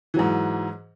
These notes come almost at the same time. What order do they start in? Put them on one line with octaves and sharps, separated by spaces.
E3 F#3 G#2